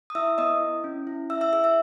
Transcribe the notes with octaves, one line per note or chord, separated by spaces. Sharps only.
D#6
E4 E5 E6
B3 D#5 D#6
E4
C#4
E4
E4 E5 E6
E5 E6
G#4 E5 E6
E5 E6